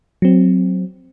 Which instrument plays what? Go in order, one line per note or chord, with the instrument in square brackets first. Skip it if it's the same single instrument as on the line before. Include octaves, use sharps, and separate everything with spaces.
[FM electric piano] F#3 C4